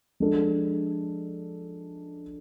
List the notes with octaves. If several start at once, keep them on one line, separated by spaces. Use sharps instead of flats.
F3 G#3 D4 A4